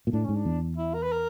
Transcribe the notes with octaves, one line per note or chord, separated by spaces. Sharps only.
A#2
A2 D4
G#2 C#4
D4
E2
E4
A#4
B4
A#4